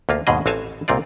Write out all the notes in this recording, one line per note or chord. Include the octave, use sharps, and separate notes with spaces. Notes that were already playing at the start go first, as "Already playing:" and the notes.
D2 A#3 F4
D#2 G#2 B2 G#4 D#5
A1 C4 F#4 F5 G#5 A5
C2 A#2 C4 F4 D5